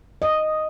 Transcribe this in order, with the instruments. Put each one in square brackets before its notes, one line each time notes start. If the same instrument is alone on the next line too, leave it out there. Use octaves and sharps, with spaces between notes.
[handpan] D#5